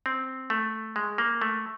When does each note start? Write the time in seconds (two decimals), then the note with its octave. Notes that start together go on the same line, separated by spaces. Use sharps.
0.06 C4
0.50 A3
0.96 G#3
1.18 A#3
1.42 A3